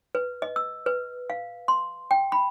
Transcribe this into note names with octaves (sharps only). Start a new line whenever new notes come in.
B4
D#5
E6
B4
F5
C6
G5
B5